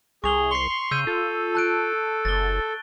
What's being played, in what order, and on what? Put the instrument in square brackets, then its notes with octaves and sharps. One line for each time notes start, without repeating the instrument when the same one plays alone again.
[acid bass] C2 [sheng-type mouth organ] G#4 [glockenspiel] C#6 F7 G7
[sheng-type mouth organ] C6 C#6 [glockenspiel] C7 G7
[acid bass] C#3 [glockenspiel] E6 G6 D#7
[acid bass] F4 [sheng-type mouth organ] A4
[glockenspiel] A5 F#6 D7
[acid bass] F#1 [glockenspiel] A6 G7